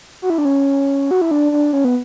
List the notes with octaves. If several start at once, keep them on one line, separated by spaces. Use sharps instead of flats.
F#4
E4
D4
C#4
F#4
E4
D4
D4
C#4
B3